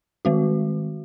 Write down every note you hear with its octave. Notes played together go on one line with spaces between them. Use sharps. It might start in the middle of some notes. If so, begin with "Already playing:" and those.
D#3 G#3 F#4